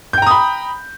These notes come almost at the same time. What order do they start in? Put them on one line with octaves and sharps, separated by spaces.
G6 G5 A#5 D#6 B5